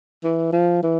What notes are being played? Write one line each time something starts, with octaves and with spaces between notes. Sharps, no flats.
E3
F3
E3